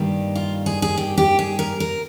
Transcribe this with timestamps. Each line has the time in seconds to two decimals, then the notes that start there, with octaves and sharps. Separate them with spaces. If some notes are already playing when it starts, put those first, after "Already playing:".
Already playing: G2 D#3 G3 A#3
0.35 F4
0.66 G#4
0.82 G#4
0.97 G4
1.18 G4
1.39 G#4
1.59 A#4
1.80 A#4